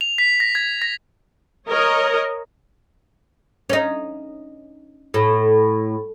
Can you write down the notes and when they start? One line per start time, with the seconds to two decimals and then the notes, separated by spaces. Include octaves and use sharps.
0.01 F7
0.18 B6
0.40 A#6
0.55 G#6
0.82 A#6
1.69 A#4 C#5 D#5
3.70 C#4 D#4
5.14 A2